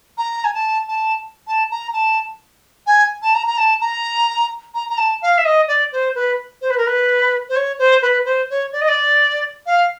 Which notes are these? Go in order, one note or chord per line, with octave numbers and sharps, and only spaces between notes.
A#5
G#5
A5
A5
A5
A#5
A5
G#5
A5
A#5
A#5
A5
A#5
A#5
A#5
A5
F5
E5
D#5
D5
C5
B4
C5
B4
A#4
B4
C5
C#5
C5
B4
C5
C#5
D5
D#5
D5
F5